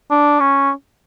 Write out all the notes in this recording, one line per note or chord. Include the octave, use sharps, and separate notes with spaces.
D4
C#4